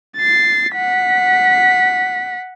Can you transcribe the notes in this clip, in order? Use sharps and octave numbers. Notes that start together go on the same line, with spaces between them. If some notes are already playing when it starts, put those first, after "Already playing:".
A6 C7
F#5 B6